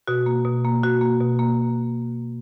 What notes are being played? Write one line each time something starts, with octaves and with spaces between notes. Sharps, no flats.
B2 F#4
A#3
B2
A#3
B2 F#4
A#3
B2
A#3